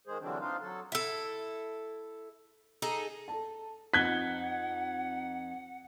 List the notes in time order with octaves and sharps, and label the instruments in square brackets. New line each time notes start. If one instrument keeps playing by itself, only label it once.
[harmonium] D#3 G#3 G#4 C5
D3 E3 F#3 G3 C4 D4
C4 D4 D#4 F4 F5
F#3 A4
[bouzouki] E4 A4
D#4 G#4 A4
[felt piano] A4 A5
[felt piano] F2 D#4 [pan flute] F#5 [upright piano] F#6 G#6 G7 [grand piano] B6